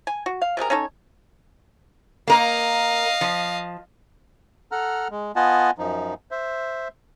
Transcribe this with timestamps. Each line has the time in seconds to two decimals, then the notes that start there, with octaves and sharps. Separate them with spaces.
0.07 G#5
0.26 F#4
0.42 F5
0.57 C3 G3 G#4 A#4
0.70 C#4 D#4 A4 C#5
2.28 A#3 A#4 D#5 F5
3.21 F3
4.72 A4 F#5 A#5 F6
5.11 G#3
5.36 B3 F4 D#5 F#5 G#5 A5
5.78 F#2 F3 D#4
6.31 C5 E5